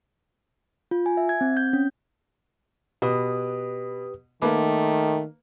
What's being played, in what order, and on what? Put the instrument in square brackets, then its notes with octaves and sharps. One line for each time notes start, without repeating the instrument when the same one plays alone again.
[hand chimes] F4
G#5
E5
G#6
C4
G6
C#4
[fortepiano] B2 [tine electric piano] G4 B4 D#6
[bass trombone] D#3 [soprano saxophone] A3 [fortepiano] A#3 B4 [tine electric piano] D6